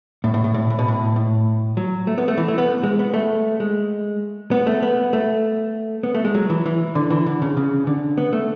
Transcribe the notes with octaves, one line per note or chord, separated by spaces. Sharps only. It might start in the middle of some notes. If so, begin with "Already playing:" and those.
A2
A2
A2
A2
A2
B2
A2
A2
F#3
A3
B3
A3
E3
A3
B3
G#3
B3
A3
G#3
B3
A3
B3
A3
B3
A3
G#3
F#3
E3
E3
D3
E3
D3
C#3
C#3
D3
B3
A3